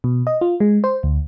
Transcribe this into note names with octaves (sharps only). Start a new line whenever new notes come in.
B2
D#5
F4
G#3
C5
D2